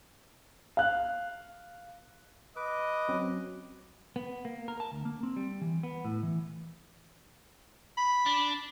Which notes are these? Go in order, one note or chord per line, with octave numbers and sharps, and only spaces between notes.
F5 F#6
B4 D#5 D6
F#2 F#3 C4 C#4
B3
A#3
A#4
A5
D2
A#3
C4
G3
E3
B3
A2
E3
B5
D4